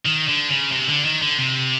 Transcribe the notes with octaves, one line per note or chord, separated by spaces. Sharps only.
D#3
D3
C#3
C3
D3
D#3
D3
C3